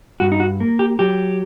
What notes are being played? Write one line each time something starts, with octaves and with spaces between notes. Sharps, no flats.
G2 F#4
D#4
F#4
A#3
G4
F#3 G4